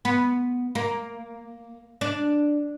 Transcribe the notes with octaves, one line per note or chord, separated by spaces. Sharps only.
B3
A#3
D4